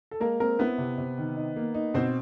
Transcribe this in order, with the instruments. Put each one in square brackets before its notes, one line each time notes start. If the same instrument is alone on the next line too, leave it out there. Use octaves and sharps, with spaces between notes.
[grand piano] A4
[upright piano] G#3 [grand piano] A#3 A#4
[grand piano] A#3 A#4 [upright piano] C4
[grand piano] B3 B4 [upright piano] E4
[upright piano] C3
C3
D#3
D#4
A#3
D#4
[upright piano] B2 [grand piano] C4 C5